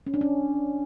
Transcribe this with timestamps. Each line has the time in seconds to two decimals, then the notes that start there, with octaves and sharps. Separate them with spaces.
0.07 C#4
0.14 D4
0.21 C#4